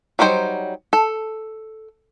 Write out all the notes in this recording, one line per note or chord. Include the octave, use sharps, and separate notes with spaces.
F#3 G3 D#4 C5 G5
A4